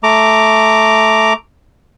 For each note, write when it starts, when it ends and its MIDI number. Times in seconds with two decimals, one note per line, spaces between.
0.03 1.33 57
0.03 1.33 82
0.03 1.33 86